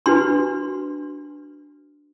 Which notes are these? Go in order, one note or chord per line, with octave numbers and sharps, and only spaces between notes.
D4 F#4 B4 C6